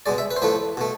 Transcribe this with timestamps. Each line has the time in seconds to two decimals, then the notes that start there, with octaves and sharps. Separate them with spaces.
0.06 B2 G#3 D5
0.18 E5
0.31 B4
0.36 C5
0.42 A2 F3 A3 B4
0.77 B2 A3